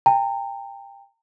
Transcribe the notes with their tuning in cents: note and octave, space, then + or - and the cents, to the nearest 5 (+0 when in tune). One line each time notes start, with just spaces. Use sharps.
G5 +25 A#5 -35